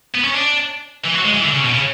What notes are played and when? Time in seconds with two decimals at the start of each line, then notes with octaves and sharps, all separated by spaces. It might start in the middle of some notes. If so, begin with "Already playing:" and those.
0.15 B3
0.24 C#4
0.34 D4
1.04 E3
1.15 F#3
1.25 G#3
1.35 E3
1.44 D3
1.54 C#3
1.65 B2
1.75 C#3